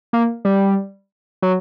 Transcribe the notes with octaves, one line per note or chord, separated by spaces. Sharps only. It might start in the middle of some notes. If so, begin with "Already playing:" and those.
A#3
G3
F#3